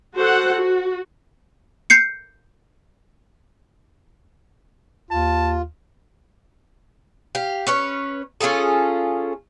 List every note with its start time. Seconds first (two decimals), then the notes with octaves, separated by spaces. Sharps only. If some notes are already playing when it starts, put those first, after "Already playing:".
0.16 F#4 A4 C5 F#5
0.55 F#4
1.90 G6 C7 C#7
5.11 D#2 F4 A5
7.35 G4 F5
7.67 C#4 B4 C#5
8.41 C#4 F4 G#4 A4